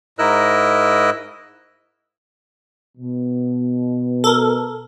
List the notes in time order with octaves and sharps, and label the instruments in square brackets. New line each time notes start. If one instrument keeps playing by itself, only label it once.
[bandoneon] G#2 E4 A#4 D#5 E6 F#6
[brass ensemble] B2
[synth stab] A4 A#4